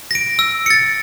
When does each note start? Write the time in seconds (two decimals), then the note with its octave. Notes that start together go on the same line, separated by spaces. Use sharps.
0.11 A#6 D7
0.39 E6
0.66 A6 C#7